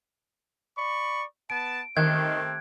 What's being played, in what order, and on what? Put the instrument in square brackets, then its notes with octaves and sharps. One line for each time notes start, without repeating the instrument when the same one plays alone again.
[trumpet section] D5 B5 C#6
[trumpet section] B3 A5 [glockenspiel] D7
[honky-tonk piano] D#3 [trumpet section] A3 C4 G4 [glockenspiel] F#6 G#6